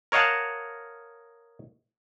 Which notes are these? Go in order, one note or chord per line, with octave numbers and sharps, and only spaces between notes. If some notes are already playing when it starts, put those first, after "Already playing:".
A#4 C#5 D#5 F5 F#5 A5